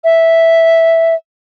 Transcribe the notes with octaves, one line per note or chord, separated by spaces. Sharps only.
E5